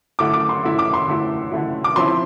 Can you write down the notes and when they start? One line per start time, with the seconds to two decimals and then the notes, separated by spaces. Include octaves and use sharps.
0.19 D3 A3 E4 D6
0.34 D6
0.49 C6
0.63 D3 A3 E4
0.79 D6
0.94 C6
1.08 D3 A3 E4
1.52 D3 A3 E4
1.84 D6
1.96 F3 C4 E4 C6